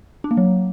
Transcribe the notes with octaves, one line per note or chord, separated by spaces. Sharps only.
D4
A#3
F#3